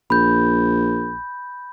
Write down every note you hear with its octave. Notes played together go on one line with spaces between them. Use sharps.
A#1 B5 G6